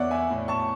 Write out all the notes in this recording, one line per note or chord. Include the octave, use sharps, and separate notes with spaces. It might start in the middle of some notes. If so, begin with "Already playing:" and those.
Already playing: E2 C#5 D5 E5 F#5
E5 G#5
A2
A5 C#6